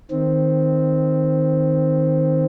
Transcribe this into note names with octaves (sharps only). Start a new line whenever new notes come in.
D#3 C4